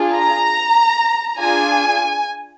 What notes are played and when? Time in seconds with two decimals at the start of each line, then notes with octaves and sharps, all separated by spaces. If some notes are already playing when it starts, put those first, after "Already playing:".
Already playing: D4 F4 G#4
0.15 A#5
1.39 D4 F4 G#4 G#5